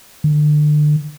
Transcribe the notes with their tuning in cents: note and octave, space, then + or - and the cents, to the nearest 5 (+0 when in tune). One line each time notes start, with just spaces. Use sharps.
D3 +30